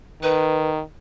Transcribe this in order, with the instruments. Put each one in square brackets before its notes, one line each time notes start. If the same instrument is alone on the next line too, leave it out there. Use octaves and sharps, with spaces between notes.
[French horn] D#3 [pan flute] B4